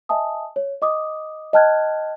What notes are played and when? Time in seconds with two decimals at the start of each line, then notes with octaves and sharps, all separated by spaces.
0.09 D#5 E5 G#5 A5 D#6
0.56 C#5
0.82 D#5 D6 D#6
1.53 D#5 G5 A5 F6 F#6 G#6